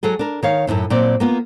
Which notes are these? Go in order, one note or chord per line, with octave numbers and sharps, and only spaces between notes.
F#3 F#4 G#4 A4
D4 A#4
D#3 C#5 F5
F#2 A2 C#3 E4
A#2 F#3 C4 D5
A#3 B3 F4